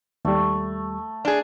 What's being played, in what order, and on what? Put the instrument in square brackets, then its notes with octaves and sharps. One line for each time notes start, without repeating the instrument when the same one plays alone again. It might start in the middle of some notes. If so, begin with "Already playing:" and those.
[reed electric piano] D#2 G3 [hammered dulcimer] A3
[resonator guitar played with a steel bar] D4 G#4